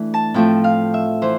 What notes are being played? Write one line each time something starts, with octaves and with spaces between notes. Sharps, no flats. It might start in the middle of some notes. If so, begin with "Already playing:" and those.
Already playing: E3 A3 D4
A5
A2 F3 A3 C4 G5
F5
E5
E3 C5